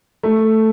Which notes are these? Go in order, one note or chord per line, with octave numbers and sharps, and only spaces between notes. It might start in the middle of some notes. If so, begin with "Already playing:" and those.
A3